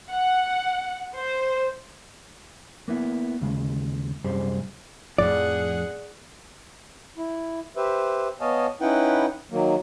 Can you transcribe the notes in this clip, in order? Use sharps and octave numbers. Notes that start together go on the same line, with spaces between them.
F#5
C5
A#3 B3 E4
D#2 C#3 G#3
C2 F#2 G3 G#4 C5
F2 A2 F3 G#4 D5 F#5
E4
G4 B4 C5 E5
B3 C#5 D#5 F5 G#5 A5
C#4 D#4 E4 B4 F#5 G5
D#3 F#3 A#3